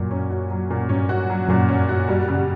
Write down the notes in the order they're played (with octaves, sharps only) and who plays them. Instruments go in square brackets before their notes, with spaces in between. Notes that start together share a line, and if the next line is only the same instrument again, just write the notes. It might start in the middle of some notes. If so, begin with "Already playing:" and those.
Already playing: [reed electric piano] F#2 [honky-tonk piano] A#2 F#3
[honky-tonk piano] C#4
F#4
F#3
A#2
[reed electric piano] G2 [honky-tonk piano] C#4
[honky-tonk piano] F#4
F#3
[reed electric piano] F#2 [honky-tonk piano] A#2
[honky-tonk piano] C#4
F#4
G3
C#3